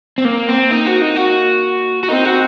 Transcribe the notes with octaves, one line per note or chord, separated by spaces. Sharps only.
C4
A#3
C4
A#3 D#4
F#4
D#4
F#4
F#4
C4 D#4
F#4